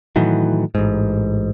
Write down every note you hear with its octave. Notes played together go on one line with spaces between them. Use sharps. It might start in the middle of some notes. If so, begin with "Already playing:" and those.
A2 D#3 E3 F#3
A1 G#2